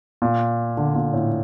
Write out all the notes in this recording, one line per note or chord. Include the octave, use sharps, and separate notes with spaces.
A#2
D3
A#2
A2